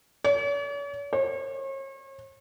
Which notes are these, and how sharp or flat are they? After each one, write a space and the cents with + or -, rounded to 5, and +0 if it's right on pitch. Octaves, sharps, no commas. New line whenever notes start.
C#5 +45
C#5 -40